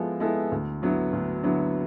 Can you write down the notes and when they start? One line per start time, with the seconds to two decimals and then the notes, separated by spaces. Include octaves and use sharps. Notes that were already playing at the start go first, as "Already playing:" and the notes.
Already playing: F3 G#3 B3 E4 A4
0.20 G#3 B3 E4 A4
0.52 D2
0.82 D3 F#3 B3 E4
1.13 D2
1.43 D3 F#3 B3 E4